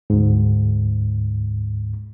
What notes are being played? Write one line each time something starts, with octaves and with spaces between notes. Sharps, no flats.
D2 G#2